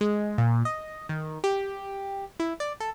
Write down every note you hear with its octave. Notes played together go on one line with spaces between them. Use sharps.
G#3
A#2
D#5
D#3
G4
E4
D5
A4